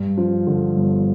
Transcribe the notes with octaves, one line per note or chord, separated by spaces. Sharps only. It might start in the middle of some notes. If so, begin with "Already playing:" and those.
Already playing: G2
F3
D3
G1